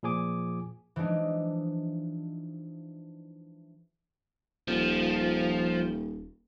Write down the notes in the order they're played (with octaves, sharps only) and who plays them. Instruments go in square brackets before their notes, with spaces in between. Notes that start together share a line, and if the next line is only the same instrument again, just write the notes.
[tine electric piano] A#2 F3 G#4 G#5 D6
[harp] E3 F3 G#3 D4 D#4
[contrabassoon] D#1 [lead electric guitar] F3